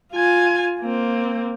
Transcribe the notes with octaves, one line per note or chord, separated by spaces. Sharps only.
F4 G#5
A#3 C4